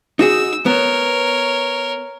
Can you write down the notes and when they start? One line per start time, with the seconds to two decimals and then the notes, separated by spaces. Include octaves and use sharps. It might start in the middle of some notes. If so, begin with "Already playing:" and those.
0.19 D#4 F#4 G#4 E6
0.66 B3 A#4 C#5